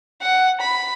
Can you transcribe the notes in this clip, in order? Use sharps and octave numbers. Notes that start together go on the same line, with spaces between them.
F#5
B5